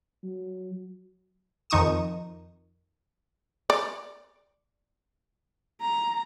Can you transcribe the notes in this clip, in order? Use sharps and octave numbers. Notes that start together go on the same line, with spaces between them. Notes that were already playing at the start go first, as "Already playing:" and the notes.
F#3
F2 D#3 D#4 C#6 D#6 E7
D5
A#5